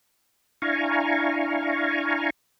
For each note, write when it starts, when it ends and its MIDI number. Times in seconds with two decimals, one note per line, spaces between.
0.62 2.30 62
0.62 2.30 64
0.62 2.30 77
0.62 2.30 80
0.62 2.30 82
0.62 2.30 85